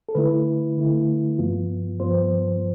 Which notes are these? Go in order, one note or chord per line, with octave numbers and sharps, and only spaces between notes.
A4
D3 A3 E4 B4
D3 A3 E4
G2 F3 B3 F4
G2 F3 B3 F4 C5